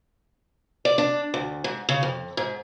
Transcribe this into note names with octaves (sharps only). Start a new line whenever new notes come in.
D5
D4
D2
G#2
C#3
F2
G#2